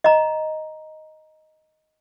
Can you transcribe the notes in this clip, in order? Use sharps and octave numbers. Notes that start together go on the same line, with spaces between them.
D#5 A#5